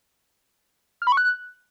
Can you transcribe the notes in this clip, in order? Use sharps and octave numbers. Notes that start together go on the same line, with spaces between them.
F6
B5
C#6
F#6